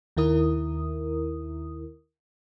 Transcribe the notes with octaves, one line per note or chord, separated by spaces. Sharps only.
D#2 D#3 E4 A#4 D#6